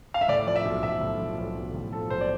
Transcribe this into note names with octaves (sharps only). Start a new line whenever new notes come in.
F5
E5
A2 D5
F3 D5
E5
B1
B1 E5
A2
F3
B1
B1
A2
F3 A4
B1 C5
D5